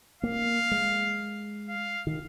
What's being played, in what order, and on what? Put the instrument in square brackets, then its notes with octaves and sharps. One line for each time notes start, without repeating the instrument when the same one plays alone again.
[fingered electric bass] A#3 [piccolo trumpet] F5
[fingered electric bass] G#3
[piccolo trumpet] F5
[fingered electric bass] D#3